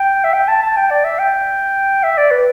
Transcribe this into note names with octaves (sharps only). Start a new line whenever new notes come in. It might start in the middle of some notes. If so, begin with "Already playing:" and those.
Already playing: G5
E5
G5
A5
A5
G5
D5
E5
G5
E5
D5
B4